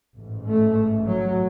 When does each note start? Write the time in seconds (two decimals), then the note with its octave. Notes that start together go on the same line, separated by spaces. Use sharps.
0.15 A1 G#2
0.47 A3
1.08 F#3